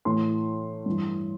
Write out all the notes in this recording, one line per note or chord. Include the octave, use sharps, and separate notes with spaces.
A2 E3 C6
G2 E3